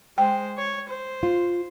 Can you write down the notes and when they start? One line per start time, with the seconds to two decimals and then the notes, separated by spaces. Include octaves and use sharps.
0.18 G#3 C5 G5
0.58 C#5
0.89 C5
1.23 F4